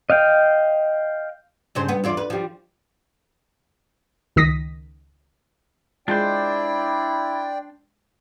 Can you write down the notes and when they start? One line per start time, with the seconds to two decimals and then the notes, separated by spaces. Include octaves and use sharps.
0.10 D#5 F5 G5
1.75 G2 C#3 C5
1.89 B3
2.04 E2 F4 D5
2.17 B4
2.30 F3 G3
4.36 C#2 D#3 D#6 A#6 B6
6.08 G#3 D4 E4 F4 C5 D5 G5